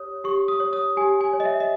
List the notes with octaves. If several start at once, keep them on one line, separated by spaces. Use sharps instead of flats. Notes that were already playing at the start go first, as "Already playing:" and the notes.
Already playing: G4 C#5 D#6
G4 C#6
D#6
C#5
D#6
G4 G#5
G#5
C#5
D#5
E5
D#5